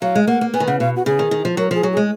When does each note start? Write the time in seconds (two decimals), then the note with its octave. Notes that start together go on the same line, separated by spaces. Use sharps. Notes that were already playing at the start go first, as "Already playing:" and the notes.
0.02 F#3 F5
0.15 G#3
0.27 A#3 F#5
0.41 A#3
0.54 B3 G#5
0.60 D#3
0.67 C#3 F#5
0.80 B2 F5
0.96 F#4
1.06 C#3 G#4
1.19 D#3
1.31 D#3
1.45 F3
1.57 F#3 A#4
1.71 F3 A#4
1.75 G#4
1.83 F#3
1.93 G#3 G#4